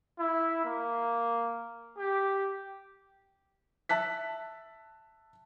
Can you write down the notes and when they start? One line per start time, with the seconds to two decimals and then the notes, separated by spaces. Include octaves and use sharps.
0.19 E4
0.64 A#3
1.97 G4
3.89 E5 A5 F#6 B6